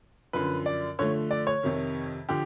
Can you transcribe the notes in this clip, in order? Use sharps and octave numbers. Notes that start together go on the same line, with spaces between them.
F#2 D3 F3 B4
D5
D3 F3 A3 C#5
D5
C#5
F2 C3 D#3
D3 F3 G4